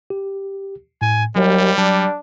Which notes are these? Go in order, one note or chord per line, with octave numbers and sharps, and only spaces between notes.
G4
A2 G#5
D#2 F#3 G3
F#3 D4